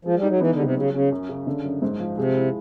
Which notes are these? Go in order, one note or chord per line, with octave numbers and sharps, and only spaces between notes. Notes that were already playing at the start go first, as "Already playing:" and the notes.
F3 G#3
G3
D#4
F#3
E3 B3
D3
C#3 G3
C3
C#3 F#3
C#3 C#4
F#2
C#3
D3
F#2
G#2
F3
C3 G#3
E4